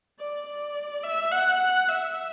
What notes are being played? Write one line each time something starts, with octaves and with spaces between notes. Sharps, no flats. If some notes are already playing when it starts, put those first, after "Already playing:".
D5
D5
E5
F#5
F#5
E5